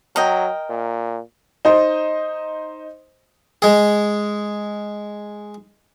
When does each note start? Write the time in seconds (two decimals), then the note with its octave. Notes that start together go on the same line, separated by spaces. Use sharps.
0.16 F#3 A#4 D#5 G5
0.70 A#2
1.65 D#4 C5 D#5
3.62 G#3 G#4